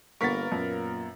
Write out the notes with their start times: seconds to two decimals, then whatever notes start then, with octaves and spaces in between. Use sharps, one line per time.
0.21 G1 A#3 B3 A#4 C#6 A6 B6
0.52 F#2 A#2